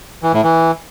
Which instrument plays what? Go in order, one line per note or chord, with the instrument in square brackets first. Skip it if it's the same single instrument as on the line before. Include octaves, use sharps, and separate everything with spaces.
[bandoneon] E3
A2
E3